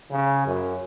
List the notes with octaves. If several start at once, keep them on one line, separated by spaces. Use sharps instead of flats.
C#3
F#2